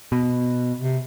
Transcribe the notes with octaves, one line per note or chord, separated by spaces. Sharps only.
B2
C3